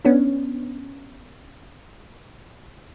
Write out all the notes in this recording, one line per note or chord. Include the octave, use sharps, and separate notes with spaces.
B3 C#4 D4